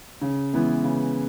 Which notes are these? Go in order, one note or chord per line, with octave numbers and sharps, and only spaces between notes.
C#3
E3 G#3 B3 E4
C#3